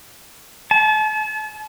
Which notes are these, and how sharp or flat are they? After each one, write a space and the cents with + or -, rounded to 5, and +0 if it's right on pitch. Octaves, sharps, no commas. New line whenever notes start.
A5 -40